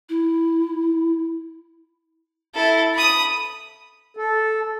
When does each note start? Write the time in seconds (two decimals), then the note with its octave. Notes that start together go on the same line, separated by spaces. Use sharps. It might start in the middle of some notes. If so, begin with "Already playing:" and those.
0.09 E4
2.55 E4 A4
2.94 B5 D#6
4.17 A4